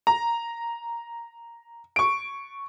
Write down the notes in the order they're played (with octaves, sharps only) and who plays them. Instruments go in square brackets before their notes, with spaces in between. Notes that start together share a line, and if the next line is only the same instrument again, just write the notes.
[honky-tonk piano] A#5
C#6 D7